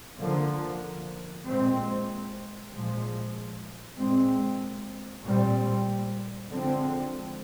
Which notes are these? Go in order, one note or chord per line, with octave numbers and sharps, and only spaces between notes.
D3 F3 A#3
A#2 G#3 C4
A#2 F3 G#3
A#2 G#3 C4
A#2 G3 C4
D3 F3 G#3 C4